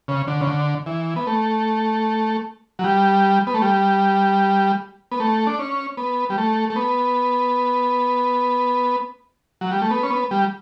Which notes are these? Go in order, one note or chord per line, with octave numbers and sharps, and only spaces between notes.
C#3
D3
C#3
D3
E3
B3
A3
F#3
G3
B3
A3
G3
B3
A3
D4
C#4
B3
G3
A3
A3
B3
F#3
G3
A3
B3
C#4
B3
G3